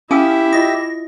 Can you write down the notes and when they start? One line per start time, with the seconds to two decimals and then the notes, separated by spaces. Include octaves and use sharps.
0.11 C#4 E4 G4 E5 F5 G#5 D#6
0.53 F4 D#5 D#6 A#6